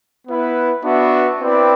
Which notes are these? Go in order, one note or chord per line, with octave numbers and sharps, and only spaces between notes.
B3 E4 B4
B3 D4 F#4 B4 E5
C4 E4 B4 D5 G5